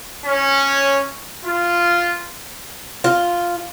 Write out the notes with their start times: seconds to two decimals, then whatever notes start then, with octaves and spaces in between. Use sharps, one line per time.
0.25 C#4
1.43 F4
3.04 F4